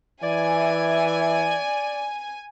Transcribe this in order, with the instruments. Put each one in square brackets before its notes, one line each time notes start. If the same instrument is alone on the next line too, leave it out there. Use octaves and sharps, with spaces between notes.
[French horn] E3 [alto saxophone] D5 [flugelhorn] E5 [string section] G#5